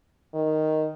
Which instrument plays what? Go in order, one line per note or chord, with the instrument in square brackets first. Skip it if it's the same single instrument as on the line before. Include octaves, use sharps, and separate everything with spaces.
[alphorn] D#3